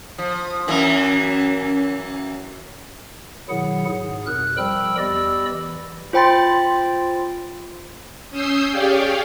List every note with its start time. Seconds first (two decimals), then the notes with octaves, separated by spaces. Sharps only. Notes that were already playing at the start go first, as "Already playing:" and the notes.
0.18 F3
0.68 F#2 E3 A#3 C#4
3.49 B2 D#3 F#3 E4 G#4 F#5
3.88 G#2 G#4
4.26 F2 B2 A#4 F#6
4.57 F3 G3 A#4 G5 B5 E6
4.98 E2 G4 D5 D#5 B5 E6
5.50 E3
6.13 F4 C5 G5 B5 A6
8.30 C#4 D#6 E6 G6 C7
8.71 G4 G#4 C#5 D5 F5 G5